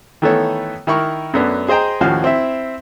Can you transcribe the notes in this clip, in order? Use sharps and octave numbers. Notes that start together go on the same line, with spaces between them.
D#3 E3 A3 B3 A4 C#5
D#3 E4 A#4 B5 C#6
F#2 A3 B3 C#4 D4
G#4 C5 D#5 G5 A#5
D#2 A2 F3 C#4 F#4 F5
C4 E4 E5